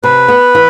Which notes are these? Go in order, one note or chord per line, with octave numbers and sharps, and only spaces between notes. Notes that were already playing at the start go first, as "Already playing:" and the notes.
C3 B4
B3
E3